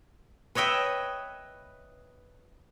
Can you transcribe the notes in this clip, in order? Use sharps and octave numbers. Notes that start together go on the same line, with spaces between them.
B4 C#5 D#5 E5 G5